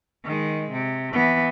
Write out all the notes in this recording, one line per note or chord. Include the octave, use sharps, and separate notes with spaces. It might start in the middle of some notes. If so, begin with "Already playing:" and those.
D#3 G#3
C3
E3 B3